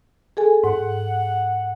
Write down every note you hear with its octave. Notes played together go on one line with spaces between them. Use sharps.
G#4 A4 G#5
G#2 F#5